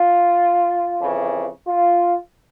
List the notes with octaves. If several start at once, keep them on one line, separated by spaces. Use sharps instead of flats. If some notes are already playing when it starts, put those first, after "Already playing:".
Already playing: F4
F2 C#3 E3
F4